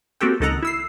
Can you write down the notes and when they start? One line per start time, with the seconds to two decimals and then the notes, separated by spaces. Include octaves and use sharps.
0.21 A#3 C4 F#4 G4 A4 G5
0.40 C#2 D#3 A4 D#5 F#5 A#5
0.63 E4 E6 C7